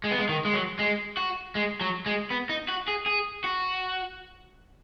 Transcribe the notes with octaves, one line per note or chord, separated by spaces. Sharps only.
G#3
B3
G#3
D#3
G#3
F#3
G#3
F#4
G#3
F#3
G#3
B3
D#4
F#4
G#4
G#4
F#4